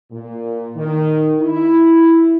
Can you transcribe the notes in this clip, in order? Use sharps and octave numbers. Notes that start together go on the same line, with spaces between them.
A#2
D#3
E4